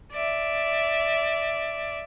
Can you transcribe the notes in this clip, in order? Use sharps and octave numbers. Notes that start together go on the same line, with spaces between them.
D5 E5